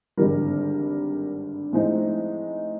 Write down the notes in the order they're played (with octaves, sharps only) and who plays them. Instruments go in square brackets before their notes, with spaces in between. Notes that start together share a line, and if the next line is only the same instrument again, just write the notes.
[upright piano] G#1 G2 D3 G3 A#4
A2 F3 G#3 C4 D#4